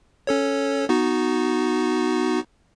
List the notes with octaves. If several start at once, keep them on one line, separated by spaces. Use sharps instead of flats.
C#4 A4 C#5
B3 D#4 F#4